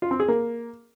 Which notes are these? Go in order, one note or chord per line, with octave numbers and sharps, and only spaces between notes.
F4
C4
G#4
A#3